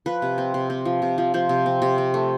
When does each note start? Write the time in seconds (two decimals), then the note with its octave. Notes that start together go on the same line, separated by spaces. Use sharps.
0.06 F3 B4
0.22 C3
0.38 C4
0.54 C3
0.70 C4
0.85 F3
1.02 C3
1.18 F3
1.34 F3 C5
1.49 C3
1.66 C4
1.82 C3
1.98 C4
2.14 A3